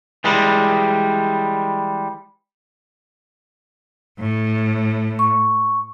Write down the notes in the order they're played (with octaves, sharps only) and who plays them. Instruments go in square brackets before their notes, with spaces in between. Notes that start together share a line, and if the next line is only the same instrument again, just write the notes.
[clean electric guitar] E3 G3 G#3
[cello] A2
[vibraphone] C#6